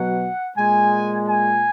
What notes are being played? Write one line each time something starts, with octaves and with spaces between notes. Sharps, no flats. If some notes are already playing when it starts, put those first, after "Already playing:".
Already playing: B2 F#3 F#5
A#2 G#3 G#5
G#5